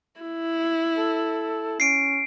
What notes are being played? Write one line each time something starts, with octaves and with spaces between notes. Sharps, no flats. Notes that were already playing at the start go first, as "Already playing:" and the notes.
E4
A4
C#4 C7 D7